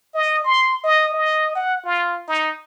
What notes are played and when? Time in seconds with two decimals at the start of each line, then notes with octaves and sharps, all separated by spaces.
0.14 D#5
0.44 C6
0.84 D#5
1.14 D#5
1.56 F#5
1.85 F4
2.28 D#4